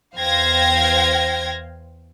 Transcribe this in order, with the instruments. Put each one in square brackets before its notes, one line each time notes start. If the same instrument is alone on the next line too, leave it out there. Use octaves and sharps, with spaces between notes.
[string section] E2 C5 F5 G5 G#6 A#6